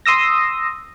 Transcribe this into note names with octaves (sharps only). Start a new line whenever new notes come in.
C6 D#6 E6 A#6